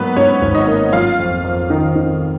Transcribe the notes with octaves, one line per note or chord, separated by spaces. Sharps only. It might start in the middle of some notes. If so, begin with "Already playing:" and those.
Already playing: G#2 F#3 A#3 B3 B4
G#2 C#4 C#5
G#1
D#4 D#5
A#3
F#3 F4 F5
F2
F2
D#3
D#3